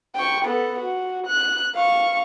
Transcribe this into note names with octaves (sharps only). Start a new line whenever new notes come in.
G5 C#6
B3 A4
F#4
F#6
F5 C#6